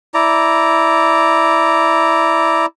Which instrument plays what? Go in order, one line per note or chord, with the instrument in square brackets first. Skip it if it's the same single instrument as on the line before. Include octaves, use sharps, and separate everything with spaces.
[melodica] E4 D5 A#5